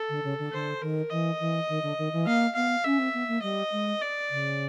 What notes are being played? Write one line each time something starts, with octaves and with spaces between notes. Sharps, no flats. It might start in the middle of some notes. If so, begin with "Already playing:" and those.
Already playing: A4
D3
C#3
D3
D3 C5
D#3 A#4
E3 D#5
E3
D#3
D3
D#3
E3
A#3 F5
B3 F5
C#4 E5
C4
B3
A#3
G3 D#5
G#3
D5
C#3